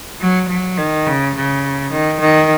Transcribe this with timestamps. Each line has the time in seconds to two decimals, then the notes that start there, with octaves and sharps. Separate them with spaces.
0.20 F#3
0.48 F#3
0.77 D#3
1.06 C#3
1.35 C#3
1.91 D#3
2.20 D#3